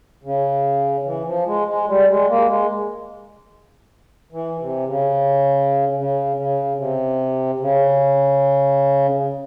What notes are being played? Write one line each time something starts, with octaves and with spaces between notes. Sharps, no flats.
C#3
E3
F3
G#3
G#3
G3
G#3
A#3
G#3
E3
C3
C#3
C#3
C#3
C3
C#3